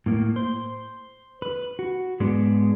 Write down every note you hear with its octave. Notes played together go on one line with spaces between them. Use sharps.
A2 A#3
C5
B4
F#4
G#2 G#3 B3 D4